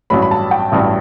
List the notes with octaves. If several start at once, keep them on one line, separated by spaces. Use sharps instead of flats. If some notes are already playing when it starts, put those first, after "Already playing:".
A1 G2 F#3 B5
B5
A5
G5
A1 G2 F#3